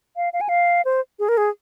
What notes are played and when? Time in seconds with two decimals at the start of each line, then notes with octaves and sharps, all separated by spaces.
0.16 F5
0.33 F5
0.41 G#5
0.49 F5
0.85 C5
1.19 G#4
1.29 A#4
1.37 G#4